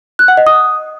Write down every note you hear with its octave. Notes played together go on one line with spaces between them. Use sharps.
F#6
F#5
D#5
D#6